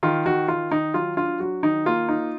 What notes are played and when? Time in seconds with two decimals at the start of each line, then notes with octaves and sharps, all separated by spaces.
0.03 D#3 F4
0.26 D#3 F#4
0.48 D#3 F4
0.71 D#3 D#4
0.94 F#3 F4
1.17 D4 F4
1.40 F#3 F#4
1.63 D#3 D#4
1.85 A#3 F4
2.08 D#4